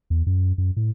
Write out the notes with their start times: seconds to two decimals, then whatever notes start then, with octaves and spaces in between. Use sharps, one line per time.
0.10 E2
0.26 F#2
0.58 F#2
0.76 A2